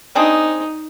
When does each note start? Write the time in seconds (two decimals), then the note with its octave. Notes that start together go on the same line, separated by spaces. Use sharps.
0.15 C4 D4 D#4 G#4